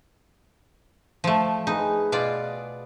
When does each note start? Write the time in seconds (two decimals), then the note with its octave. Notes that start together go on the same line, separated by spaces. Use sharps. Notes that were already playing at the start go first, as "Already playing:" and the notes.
1.24 F3 A3
1.67 D#4 G#4 B4
2.12 B2 F4 D5